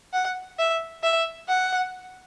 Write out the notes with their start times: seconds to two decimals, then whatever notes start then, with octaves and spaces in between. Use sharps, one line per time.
0.13 F#5
0.59 E5
1.03 E5
1.48 F#5